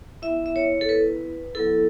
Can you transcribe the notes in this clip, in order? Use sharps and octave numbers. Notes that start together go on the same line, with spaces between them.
B3 E4 E5
E5
C#5
A4
B4
F#3 B3 E4 A4